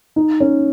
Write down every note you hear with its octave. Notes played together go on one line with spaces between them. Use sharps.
D#4
C#4